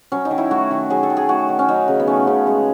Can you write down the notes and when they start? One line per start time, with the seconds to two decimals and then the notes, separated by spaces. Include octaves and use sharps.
0.12 F#3 C#4
0.25 D#4
0.31 D#3
0.38 E4
0.51 A3 F#4
0.71 D#3
0.90 F#3 G#4
1.03 A4
1.10 D#3
1.17 G#4
1.29 A3 F#4
1.49 D#3
1.59 C#4
1.68 F#3 D#4
1.88 C#3
2.00 B3
2.07 A3 C#4
2.27 C#3
2.47 G#3